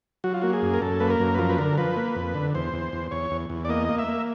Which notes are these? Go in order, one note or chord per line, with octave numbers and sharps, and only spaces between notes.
F#3 F#4
F4
A#3 F#4
G#4
F#2
A#4
F#2 A4
A#3 B4
A#4
F#2
B4
F3 A#4
B4
D3 A#4
F3 B4
A#3
F2
D3
E2 C5
E2
E2
E2 C#5
E2
E2
D5
A#3 D#5
A#3
E5
A#3